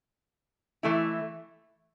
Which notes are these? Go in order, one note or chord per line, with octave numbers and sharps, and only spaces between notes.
E3 A3 E4